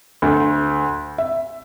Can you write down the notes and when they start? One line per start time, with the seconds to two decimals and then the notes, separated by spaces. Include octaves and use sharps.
0.22 D2
1.18 E5